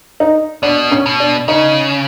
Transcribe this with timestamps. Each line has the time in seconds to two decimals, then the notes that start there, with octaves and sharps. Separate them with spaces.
0.20 D#4
0.63 B2 D4
0.91 C#4
1.06 B2
1.20 D4
1.48 C#3 D#4